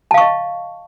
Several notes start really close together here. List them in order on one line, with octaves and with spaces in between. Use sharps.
A5 F5 C#6 D#5